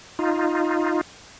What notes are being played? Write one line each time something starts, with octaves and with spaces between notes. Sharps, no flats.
D#4 F4